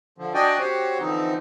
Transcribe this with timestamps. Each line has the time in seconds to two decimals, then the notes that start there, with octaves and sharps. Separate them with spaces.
0.18 D3 F3
0.34 D4 F#4 D5 D#5 G5 G#5
0.58 C4 F#4 G4 C5 C#5
1.00 D3 E3 F3 C4 D#4